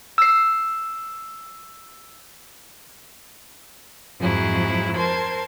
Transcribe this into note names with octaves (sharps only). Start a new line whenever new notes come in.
E6 C7
F2 G#2 F3 F#3 E4 G#4
A#4 C5 A5 C6 G#6